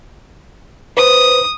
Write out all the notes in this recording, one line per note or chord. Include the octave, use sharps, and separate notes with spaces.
B4 C5 D#6